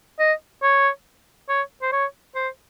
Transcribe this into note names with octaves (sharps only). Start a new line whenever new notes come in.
D#5
C#5
C#5
C5
C#5
C5